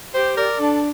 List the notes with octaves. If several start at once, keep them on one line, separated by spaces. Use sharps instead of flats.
G4 C5
A#4 D5
D4 A4